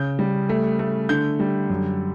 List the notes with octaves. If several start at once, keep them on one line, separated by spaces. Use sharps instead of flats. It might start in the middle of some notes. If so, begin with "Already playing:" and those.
Already playing: C#3 G6
G3
A3
A3
D3 G6
G3
F#2